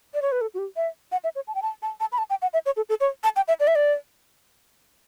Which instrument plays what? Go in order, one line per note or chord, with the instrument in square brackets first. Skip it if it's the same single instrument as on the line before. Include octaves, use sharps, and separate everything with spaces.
[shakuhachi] D5
C#5
B4
A4
F#4
G4
E5
F#5
E5
C#5
A5
G5
A5
A5
A5
B5
A5
G5
F#5
E5
C#5
A4
A4
C#5
A5
G5
E5
D5
E5
D5